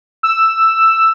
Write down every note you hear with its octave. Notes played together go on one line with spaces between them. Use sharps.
E6